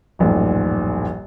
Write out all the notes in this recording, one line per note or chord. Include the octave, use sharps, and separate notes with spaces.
D#1 A#1 F#2 A2 D#3